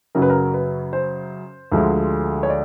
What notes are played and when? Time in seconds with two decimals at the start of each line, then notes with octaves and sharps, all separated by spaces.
0.15 F#2 C#3 F#3 A#4
0.22 B4
0.30 A#4
0.54 B4
0.93 C5
1.72 D2 D3 F3 G#3
2.43 C#5
2.50 D5